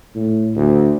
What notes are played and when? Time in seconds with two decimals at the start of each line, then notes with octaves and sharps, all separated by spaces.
0.15 A2
0.55 D2